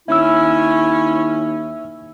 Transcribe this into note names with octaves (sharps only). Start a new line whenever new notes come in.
D#2 C#4 E4 E5 E6